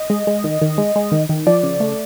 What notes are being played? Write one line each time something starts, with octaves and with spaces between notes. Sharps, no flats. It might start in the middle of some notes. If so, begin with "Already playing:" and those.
Already playing: D#5
G#3
G#3
D#3
D#3
G#3
G#3
D#3
D#3
F3 D5
C#3
A3